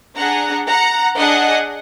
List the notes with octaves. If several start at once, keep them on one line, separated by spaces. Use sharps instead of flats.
D4 G#4 F#5 A#5
F#5 A#5
D4 G#4 D#5 F#5